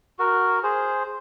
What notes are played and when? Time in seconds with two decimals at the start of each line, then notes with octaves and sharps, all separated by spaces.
0.19 F#4 A#4
0.63 G#4 C5